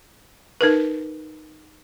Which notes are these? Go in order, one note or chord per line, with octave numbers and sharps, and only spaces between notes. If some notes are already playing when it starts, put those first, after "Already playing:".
D#4 A#4 B4